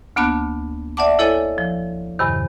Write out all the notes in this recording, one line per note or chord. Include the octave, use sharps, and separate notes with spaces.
D2 A#3 B3 D4 A5 F#6
D5 E5 F#5 A5 D6
E4 A4 C#5 D#5 G#5
F3
E2 G2 C3 D#3